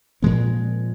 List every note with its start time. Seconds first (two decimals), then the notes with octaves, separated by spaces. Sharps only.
0.22 A#2 F3 G#3 C4